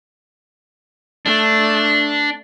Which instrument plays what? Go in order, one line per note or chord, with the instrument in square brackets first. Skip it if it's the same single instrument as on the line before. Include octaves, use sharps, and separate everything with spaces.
[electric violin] A3 [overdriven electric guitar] D4